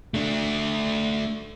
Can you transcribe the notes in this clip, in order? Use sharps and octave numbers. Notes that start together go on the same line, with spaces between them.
A3 D4